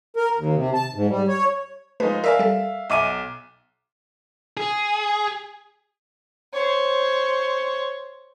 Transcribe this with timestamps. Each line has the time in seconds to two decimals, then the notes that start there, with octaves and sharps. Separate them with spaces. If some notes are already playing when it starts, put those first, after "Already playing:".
0.17 A#4
0.37 D#2
0.55 C3
0.74 A5
0.94 G#2
1.08 G3
1.28 C#5
2.00 F3 G#3 A3 D#4 B4
2.24 A#4 D5 E5 F5 G#5 E6
2.39 G3 A4
2.90 B1 D#5 E5 G#5 D6 D#7
4.57 G#4
6.53 C5 C#5